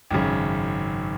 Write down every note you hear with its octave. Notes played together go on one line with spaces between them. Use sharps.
G#1 F#2 C#3